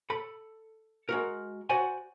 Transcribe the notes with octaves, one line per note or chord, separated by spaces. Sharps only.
A4 B5
G#3 F#4 A#4
F#4 C5 D5 F#5 G#5